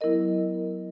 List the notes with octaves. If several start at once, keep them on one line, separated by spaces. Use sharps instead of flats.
F#3 B3 E4 A#4 D#5